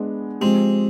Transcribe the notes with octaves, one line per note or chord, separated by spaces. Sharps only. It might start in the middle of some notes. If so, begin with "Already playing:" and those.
Already playing: G#3 B3 D4
F3 G#3 C4 G4